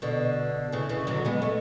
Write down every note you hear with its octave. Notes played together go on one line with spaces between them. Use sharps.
B2 D3
C#3 E3
C#3 E3
D3 F#3
G#3 B3
A3 C#4